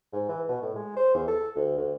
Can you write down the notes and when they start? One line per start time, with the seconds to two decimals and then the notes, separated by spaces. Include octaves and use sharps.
0.13 G#2
0.29 E3
0.49 B2
0.62 A2
0.75 G#3
0.96 C5
1.15 E2
1.28 A4
1.56 D2
1.78 D2